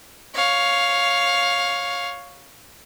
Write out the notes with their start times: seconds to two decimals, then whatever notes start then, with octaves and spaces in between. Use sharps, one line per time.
0.35 C#5 F5